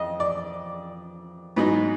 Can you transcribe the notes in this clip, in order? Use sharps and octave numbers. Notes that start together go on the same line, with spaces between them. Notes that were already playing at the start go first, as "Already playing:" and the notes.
Already playing: F2 D#5
D5
G#2 F#3 B3 D#4 B4